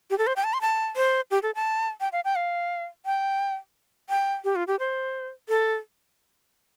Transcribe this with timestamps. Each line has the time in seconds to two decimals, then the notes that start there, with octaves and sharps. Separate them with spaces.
0.10 G4
0.18 A4
0.27 C5
0.36 G5
0.44 A5
0.53 C6
0.61 A5
0.96 C5
1.31 G4
1.43 A4
1.55 A5
2.01 G5
2.12 F5
2.25 G5
2.36 F5
3.06 G5
4.10 G5
4.44 G4
4.56 F4
4.67 G4
4.79 C5
5.49 A4